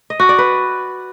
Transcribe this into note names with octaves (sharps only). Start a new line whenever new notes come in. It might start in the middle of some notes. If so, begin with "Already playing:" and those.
D#5
F#4
D5
B4